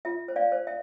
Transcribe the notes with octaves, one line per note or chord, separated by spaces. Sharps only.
F4 E5
C5
D5 F5
C5
E5